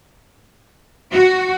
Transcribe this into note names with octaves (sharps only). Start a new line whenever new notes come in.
F#4